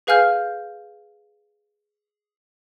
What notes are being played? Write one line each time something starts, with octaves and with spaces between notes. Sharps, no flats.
G#4 B4 F5 G#5 F6 G6